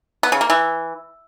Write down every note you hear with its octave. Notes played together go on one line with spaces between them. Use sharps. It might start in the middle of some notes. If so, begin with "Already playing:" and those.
B3
C#3
A#3
E3